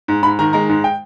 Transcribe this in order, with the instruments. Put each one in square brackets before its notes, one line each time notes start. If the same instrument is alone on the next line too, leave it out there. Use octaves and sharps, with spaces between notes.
[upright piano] G#2
G#2 B5
D#3 A#5
G#3 A#5
G#2
G5